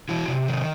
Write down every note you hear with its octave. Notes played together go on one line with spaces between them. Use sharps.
E3 E4 F#4
C3
D#3